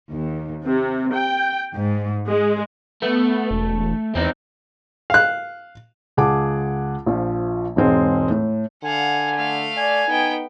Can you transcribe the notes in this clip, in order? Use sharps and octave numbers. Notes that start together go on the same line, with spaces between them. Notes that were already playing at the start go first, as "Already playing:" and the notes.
D#2
C3
G5
G#2
G#3
A3 B3
E1
E2 C4 D#4
F5 F#6
C#2 G#4 F#5 A5 D6
A#1 F3
E1 G#2 G#3 C4 D#5
A2
D3 F5 F#5 G#5
A3 F5
D5 G#5
B3 D#4 G5